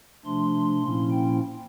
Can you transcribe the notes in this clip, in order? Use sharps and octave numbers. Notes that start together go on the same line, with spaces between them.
C3 F3 A3 D4 C6
A#2 F3 A#3 C#4 E4
G5